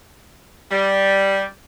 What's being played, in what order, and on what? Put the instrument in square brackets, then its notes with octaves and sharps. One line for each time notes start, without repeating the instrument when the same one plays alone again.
[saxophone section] G3